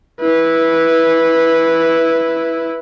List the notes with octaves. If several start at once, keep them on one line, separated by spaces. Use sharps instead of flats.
E4 B4